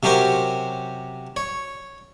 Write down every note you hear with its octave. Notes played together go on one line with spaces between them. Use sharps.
C3 F#3 C#4 G4 A#4 C5
C#5